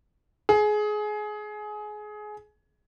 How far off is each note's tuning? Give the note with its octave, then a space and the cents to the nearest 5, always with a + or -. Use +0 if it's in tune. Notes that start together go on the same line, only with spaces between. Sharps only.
G#4 +20